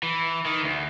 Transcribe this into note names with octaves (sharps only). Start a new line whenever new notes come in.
E3
D#3
D2